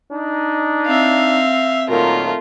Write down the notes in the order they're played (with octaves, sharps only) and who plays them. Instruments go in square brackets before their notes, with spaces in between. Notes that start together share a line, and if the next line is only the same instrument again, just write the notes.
[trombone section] D4 D#4
[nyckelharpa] C4 E5 [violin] F5
[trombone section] A#2 D#3 F#3 [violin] A3 F4 [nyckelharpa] A#4